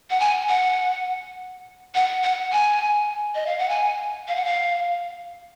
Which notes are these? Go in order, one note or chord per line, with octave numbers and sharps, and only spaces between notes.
F#5
G#5
F#5
F#5
F#5
G#5
D#5
F5
F#5
G#5
F5
F#5
F5